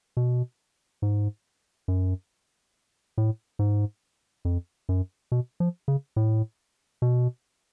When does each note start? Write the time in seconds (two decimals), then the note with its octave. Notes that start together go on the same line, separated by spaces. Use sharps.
0.17 B2
1.02 G#2
1.88 F#2
3.18 A2
3.59 G#2
4.45 F2
4.89 F#2
5.32 B2
5.60 F3
5.88 C#3
6.16 A2
7.02 B2